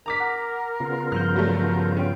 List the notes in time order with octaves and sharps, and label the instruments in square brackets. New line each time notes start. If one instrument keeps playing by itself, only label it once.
[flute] A#4 [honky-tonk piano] A#5 D6 B6
[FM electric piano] F#5
[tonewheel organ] C#3 B3 F4
[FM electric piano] G2 F3 G6 [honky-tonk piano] F6
[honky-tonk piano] F#3 G3 A3
[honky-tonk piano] C#4 [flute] G5